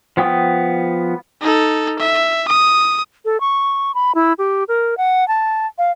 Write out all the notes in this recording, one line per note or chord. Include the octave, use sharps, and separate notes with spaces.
F3 B3 G5 D#6
D#4 A4
E5
D#6
A4
C#6
B5
E4
G4
A#4
F#5
A5
F5